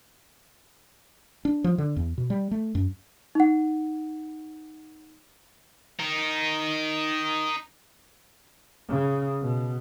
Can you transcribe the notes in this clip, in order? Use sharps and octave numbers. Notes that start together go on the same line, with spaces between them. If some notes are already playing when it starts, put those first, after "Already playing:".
D4
F3
D3
E2
B2
G3
A3
F#2
D#4 F#5
D#4 A#4
C#3
B2